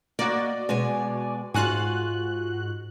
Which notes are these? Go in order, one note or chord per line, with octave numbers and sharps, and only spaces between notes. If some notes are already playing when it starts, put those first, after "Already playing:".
A#3 F#4 D5 D#5
B2 G#3 G#5
G#2 F4 F#4 G#5 F#6